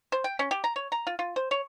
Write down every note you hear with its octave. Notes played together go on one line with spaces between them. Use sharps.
C5
G5
C#4
G4
A#5
C#5
A#5
F4
F4
C5
C#5